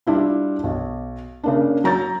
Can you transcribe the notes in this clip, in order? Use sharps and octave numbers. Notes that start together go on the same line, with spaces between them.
G3 D4 E4 F4
B1
C#3 A#3 D4
F#3 A#5 G6 A6